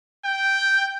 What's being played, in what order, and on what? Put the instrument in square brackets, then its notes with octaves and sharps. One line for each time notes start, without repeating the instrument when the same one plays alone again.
[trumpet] G5 [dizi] G6